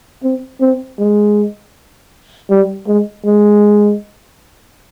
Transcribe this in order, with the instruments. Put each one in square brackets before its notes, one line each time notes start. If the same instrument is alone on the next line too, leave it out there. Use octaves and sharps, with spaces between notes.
[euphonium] C4
C4
G#3
G3
G#3
G#3